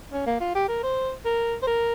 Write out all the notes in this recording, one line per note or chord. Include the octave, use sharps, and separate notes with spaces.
C#4
A#3
F4
G4
A#4
C5
A#4
C5
A#4